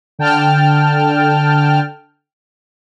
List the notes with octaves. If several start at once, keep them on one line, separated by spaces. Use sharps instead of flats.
D3 G5 A5 F6